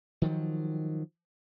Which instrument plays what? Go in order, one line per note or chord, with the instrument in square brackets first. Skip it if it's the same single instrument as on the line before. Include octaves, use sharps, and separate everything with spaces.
[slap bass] D#3 F3 F#3